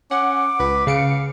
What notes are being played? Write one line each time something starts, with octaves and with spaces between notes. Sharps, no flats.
C#4 F#5 D6
C#2 B4
C#3 F5 C#7 D7